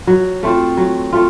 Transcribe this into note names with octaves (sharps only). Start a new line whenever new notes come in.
F#3
A3 C4 F4
F#3
A3 C4 F4